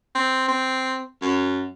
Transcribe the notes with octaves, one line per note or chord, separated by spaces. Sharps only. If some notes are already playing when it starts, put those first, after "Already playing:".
C4
C4
F#2